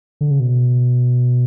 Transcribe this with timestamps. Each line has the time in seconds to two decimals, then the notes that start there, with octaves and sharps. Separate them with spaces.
0.21 D3
0.31 C#3
0.40 B2